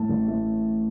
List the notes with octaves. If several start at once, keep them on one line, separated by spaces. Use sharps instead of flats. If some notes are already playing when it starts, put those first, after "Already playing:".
Already playing: A2 A3 A5
A1
A2 A3